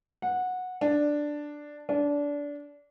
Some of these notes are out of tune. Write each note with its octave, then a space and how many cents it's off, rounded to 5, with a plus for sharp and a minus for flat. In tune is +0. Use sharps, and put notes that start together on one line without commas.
F#5 -15
D4 +5
D4 -20